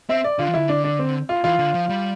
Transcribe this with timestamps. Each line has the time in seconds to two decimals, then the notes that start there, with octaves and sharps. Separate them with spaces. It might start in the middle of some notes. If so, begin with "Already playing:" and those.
0.09 C4 E5
0.24 D5
0.39 D3 F4
0.48 E3
0.54 D3 E4
0.69 D4
0.84 D4
0.99 C4
1.29 F4
1.44 E3 F4
1.59 D3
1.74 F3
1.89 G3